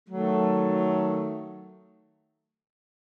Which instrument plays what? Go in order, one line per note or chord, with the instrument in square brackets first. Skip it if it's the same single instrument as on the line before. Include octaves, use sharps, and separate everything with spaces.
[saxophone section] D#3 F#3 A3